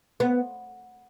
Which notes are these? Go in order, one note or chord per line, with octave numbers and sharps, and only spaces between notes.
B3